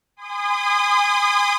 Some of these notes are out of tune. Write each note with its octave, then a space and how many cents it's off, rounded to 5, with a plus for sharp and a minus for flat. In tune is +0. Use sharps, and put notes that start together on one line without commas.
G#5 -25 C6 -40 D#6 -30